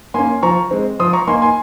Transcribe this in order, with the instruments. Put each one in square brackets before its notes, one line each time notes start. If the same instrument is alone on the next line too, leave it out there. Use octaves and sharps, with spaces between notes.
[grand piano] A#3 G#5 C6
C#4
F3 A#5 C#6
G#3 C4
F3 C6 D#6
A#5 C#6
A#3 D#4 G#5 C6
G#5 C6